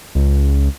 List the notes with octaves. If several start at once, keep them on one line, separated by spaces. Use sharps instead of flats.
C#2